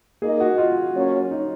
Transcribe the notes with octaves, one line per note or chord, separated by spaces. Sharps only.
A#3 D#4 G#4 A#4 D#5
F#4
F4
F#3 A#3 C#4 F#4 C#5
D#4